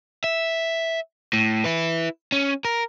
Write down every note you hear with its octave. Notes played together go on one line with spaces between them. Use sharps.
E5
A2
E4 B4
C#4
A#4